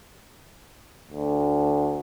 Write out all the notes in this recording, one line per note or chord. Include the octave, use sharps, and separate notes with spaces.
D2